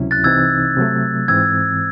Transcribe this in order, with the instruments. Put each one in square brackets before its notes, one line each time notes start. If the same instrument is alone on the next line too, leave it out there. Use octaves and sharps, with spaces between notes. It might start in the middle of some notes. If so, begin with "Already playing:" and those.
Already playing: [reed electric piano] C#2 C3 F#3 C#4 E4
[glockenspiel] F#6 A6
[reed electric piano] C2 C3 E3 C4 D#4 [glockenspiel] E6 G#6
[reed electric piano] C3 F#3 A3
[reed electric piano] G#2 E3 C4 [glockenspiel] E6 G#6